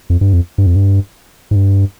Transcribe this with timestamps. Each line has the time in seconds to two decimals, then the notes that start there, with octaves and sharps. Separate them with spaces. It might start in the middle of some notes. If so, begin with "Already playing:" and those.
0.10 F2
0.21 G2
0.33 F2
0.58 G2
0.66 F2
0.76 G2
1.51 G#2
1.56 G2